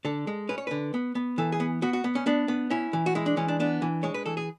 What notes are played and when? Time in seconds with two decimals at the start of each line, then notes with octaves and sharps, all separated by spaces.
0.05 D3 A4
0.27 G#3
0.49 C#4 B4
0.58 C#5
0.67 D3 B4
0.94 B3
1.15 B3
1.38 E3 A4
1.52 G#4
1.60 B3
1.82 B3 F#4
1.93 F#4
2.04 B3
2.15 C#4
2.26 B3 D4
2.48 B3
2.70 C#4 E4
2.93 E3
3.06 F#4
3.15 G#3 E4
3.26 D4
3.37 E3 C#4
3.48 D4
3.60 B3 D4
3.82 E3
4.03 G#3 C#5
4.14 B4
4.26 E3 A4
4.37 G#4